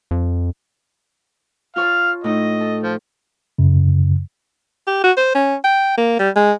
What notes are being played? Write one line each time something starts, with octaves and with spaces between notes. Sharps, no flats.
F2
F4 C#5 F5 A5
A2 D#4 D#5
A4
F3
F#2 C#3
G4
F#4
C5
C#4
G5
A#3
G3
G#3